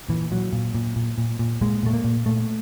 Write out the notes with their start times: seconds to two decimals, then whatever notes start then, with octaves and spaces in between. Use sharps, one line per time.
0.09 A#2 E3
0.31 A#2 F#3
0.53 A#2
0.75 A#2
0.96 A#2
1.18 A#2
1.39 A#2
1.61 A#2 G#3
1.83 A#2 A3
1.93 A#3
2.04 A#2
2.26 A#2 A3